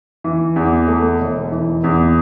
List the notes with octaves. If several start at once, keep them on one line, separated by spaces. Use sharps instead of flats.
E3
E2
A3
E1
E3
E2